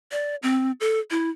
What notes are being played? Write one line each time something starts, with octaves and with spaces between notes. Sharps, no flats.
D5
C4
A4
E4